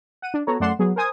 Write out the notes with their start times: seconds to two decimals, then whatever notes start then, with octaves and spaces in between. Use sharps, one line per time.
0.22 F#5 D#7
0.34 D4
0.47 B3 F#4 A4 C#5 A#5
0.60 F#2 A3 D5 F#5 C6 E7
0.79 F#3 B3 G#4
0.96 A#4 C5 G#5 D#6 G#6